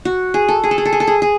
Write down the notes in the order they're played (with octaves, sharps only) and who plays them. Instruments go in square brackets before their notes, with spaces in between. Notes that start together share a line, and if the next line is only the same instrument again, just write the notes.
[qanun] F#4
G#4
A4
G#4
A4
G#4
A4
G#4
A4
G#4
G#4